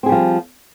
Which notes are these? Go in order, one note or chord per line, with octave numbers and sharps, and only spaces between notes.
F3 G3 C4 G#4